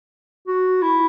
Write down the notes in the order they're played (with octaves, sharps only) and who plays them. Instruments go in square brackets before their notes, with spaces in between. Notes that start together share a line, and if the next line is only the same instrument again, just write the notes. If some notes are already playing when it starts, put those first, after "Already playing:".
[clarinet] F#4
E4